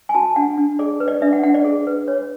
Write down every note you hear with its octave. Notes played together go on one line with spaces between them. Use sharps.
G#5
F#4 A5
D4 F#5
D4
G#4 D5
B4
D5
D4 E5
F#5
D4 F#5
D5
G#4
B4
C#5